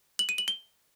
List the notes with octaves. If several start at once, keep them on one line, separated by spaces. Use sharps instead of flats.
F#7
D#7
F#7
G7